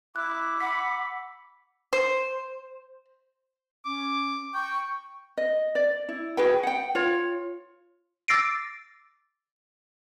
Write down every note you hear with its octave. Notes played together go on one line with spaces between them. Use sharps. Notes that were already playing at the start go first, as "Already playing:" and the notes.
E4 D6 F#6
F#5 B5 E6 B6
C5
C#4 D6
G5 C#6
D#5
D5
E4
F#4 G#4 B4 G5
F#5 G5
F4 C#5
D6 E6 A6 A#6 C7 D7